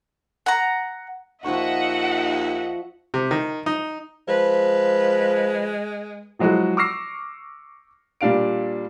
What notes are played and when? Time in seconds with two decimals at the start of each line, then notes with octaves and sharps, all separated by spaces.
0.46 F#5 A#5
1.44 D#2 F3 D#5 E5 F#5 C#6
3.14 C3
3.31 D#3
3.66 D#4
4.28 F3 G#3 B4
6.39 F3 F#3 G#3 E4 F#4 G#4
6.77 C#6 D6 E6 F6 A#6 C7
8.21 A#2 G3 D4 F5 D7